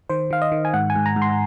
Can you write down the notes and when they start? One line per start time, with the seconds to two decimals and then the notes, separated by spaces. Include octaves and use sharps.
0.10 D#3 C5
0.31 D#3 F5
0.42 D#5
0.52 D#3
0.65 G#5
0.73 G#2 F#5
0.90 G#5
0.96 G#2
1.06 A#5
1.16 G#2
1.22 C6